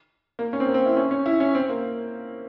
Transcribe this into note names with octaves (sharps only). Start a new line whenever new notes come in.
A#3
C#4
C4
A#3
C4
E4
C#4
C#4
E4
C#4
C4
A#3